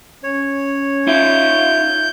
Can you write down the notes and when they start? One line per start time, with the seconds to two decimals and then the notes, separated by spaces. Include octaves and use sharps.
0.23 C#4 C#5
1.07 D#4 F4 E5 G6